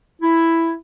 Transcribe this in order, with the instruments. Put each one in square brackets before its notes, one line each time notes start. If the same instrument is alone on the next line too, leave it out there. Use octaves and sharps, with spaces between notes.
[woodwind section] E4